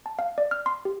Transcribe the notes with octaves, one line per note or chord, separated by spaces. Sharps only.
A5
F5
D5
F6
C6
G4